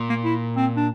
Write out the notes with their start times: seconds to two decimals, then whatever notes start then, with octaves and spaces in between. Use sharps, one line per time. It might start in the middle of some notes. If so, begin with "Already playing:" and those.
Already playing: A#2
0.10 A#3
0.24 E4
0.57 C4
0.77 D4